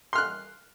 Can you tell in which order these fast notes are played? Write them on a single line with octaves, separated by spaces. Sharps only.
C6 F6 F#6